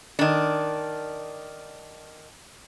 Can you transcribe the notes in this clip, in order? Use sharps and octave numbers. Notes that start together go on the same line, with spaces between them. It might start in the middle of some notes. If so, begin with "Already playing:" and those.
D#3 D4